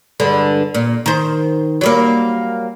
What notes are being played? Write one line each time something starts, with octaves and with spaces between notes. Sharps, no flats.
G2 D3 G#3
A#2
D#3 C5
F#3 G3 A#3